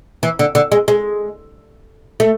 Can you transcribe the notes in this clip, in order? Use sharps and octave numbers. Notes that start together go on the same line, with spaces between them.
E3
D3
D3
G#3
G#3
A3